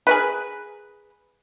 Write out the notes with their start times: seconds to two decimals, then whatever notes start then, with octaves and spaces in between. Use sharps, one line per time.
0.07 G#4 A#4 B4